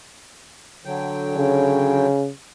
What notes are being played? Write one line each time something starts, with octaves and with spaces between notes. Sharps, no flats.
D3 F#3 G5
C#3